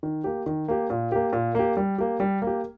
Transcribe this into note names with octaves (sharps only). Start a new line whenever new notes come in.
D#3
A#3 G4
D#3
A#3 G4
A#2
A#3 G4
A#2
A#3 G4
G3
A#3 G4
G3
A#3
G4